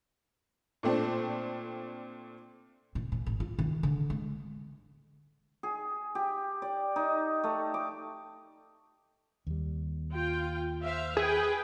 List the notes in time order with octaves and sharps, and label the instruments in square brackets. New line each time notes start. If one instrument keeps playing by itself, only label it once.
[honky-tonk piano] A#2 A3 C4 D4
[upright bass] A#2
A#2
G#1
F4
D#3
D3
G#3
[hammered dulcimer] G#4
G4
D5
D#4
A3
D6
[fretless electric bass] D#2 G3
[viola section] F4 G5
C5 E5 F5
[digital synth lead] G#4 [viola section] B4 G5